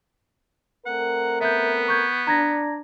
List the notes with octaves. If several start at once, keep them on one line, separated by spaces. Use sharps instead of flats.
A3 C4 A#4 F#5
B3 E5 G6
C#6 G6 G#6
D4 A#5 G#6 A#6